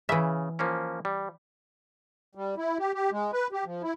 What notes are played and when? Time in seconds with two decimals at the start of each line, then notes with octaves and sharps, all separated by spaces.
0.09 C#3 E3 E5
0.59 F3 A#3 C#4
1.05 G3
2.35 G3
2.57 E4
2.79 G4
2.94 G4
3.12 G#3
3.33 B4
3.52 G4
3.65 F3
3.83 E4